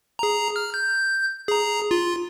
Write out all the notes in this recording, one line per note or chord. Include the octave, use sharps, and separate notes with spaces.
G#4 A#5
F6
G6
G#4 A#5
F4